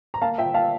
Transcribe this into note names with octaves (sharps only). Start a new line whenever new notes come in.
A#5
A#3 F5 A5
A#2 E5 G5
A#2 F5 A5